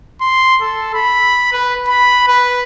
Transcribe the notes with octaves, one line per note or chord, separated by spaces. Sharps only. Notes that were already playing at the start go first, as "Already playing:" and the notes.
C6
A4
B5
B4
B5
B4